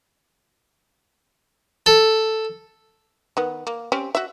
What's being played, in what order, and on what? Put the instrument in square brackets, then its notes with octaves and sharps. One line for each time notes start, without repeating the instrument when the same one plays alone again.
[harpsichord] A4
[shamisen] D#3 B3
A#3
C4 C#4 G4
F#4 E5